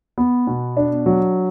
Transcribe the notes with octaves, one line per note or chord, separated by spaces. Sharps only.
B3
B2
D4
F#3